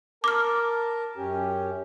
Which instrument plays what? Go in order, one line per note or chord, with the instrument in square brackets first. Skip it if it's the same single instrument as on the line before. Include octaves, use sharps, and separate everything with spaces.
[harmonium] A#4 A5 [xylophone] D6 F6
[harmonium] F#2 C#4 G4